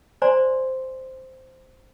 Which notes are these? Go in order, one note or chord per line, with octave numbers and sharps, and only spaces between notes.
C5 D5 G#5 A#5 C6